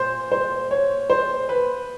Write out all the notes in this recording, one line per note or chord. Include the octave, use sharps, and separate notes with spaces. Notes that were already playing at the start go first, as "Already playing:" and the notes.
Already playing: A#2 C5
C5
C#5
C5
B4